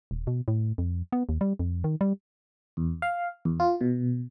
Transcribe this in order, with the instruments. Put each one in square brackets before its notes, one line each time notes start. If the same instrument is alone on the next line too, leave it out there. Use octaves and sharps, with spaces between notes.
[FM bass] D#1
B2
A2
F2
B3
D#2
G3
F2
D#3
G3
[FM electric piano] E2
F5
E2
F4
B2